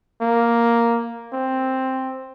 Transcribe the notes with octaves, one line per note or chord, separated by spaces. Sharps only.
A#3
C4